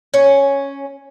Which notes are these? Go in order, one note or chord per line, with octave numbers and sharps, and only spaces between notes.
C#4